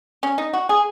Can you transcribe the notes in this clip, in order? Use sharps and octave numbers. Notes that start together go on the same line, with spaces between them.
C#4
D#4
F#4
G#4